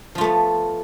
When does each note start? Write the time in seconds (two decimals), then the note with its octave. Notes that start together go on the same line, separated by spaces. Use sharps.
0.15 F3
0.18 F4
0.21 A3
0.24 B3